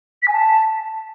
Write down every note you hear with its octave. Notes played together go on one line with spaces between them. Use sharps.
B6
G#5
A5